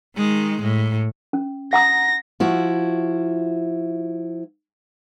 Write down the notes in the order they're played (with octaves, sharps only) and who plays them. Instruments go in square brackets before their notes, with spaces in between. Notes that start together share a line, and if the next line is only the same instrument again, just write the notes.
[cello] D#3 G#3
A2
[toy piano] C#4
[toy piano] F#5 A#5 D#6 [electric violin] A#6
[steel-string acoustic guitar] F3 E4 F#4